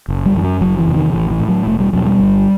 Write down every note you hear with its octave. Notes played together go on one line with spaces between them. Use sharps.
F#1
G3
F#2 E3
F#3
F#1 F#3
E3
E2 C3
D#3
A1 E3
E3
A2
F#3
E1 A3
G3
E2 B2 F#3
G3
G1